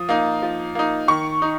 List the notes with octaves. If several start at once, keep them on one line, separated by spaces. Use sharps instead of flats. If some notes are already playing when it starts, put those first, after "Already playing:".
Already playing: F3 D#6
A#3 D#4
F3
A#3 D#4
D#3 C#6
D#4